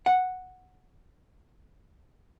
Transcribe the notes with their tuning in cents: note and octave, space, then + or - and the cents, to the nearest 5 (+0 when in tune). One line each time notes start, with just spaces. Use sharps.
F#5 -5